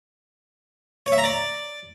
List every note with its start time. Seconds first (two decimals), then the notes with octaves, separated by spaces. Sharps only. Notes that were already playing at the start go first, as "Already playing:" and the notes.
1.06 C#5
1.12 E5
1.18 A#5
1.24 D5